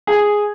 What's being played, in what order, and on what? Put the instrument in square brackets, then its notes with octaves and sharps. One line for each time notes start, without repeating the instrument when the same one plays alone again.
[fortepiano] G#4